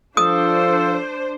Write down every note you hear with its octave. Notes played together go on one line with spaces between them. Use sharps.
F3 D4 F4 A4 C5 D#6